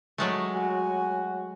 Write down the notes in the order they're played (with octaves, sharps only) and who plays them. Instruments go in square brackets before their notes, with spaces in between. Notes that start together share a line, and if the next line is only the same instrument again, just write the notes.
[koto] F#3 G#3 A3
[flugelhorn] F#4 [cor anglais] G#5